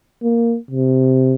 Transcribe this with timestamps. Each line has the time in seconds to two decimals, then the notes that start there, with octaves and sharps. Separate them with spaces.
0.23 A#3
0.71 C3